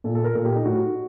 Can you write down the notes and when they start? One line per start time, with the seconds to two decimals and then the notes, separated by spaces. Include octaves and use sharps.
0.04 A#2 A4
0.15 A4
0.24 A#4
0.35 A#2 A4
0.45 G4
0.55 D#4
0.65 A2 F#4